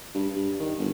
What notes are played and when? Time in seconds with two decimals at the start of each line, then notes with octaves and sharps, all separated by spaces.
0.14 G2
0.36 G2
0.59 D#3
0.78 G1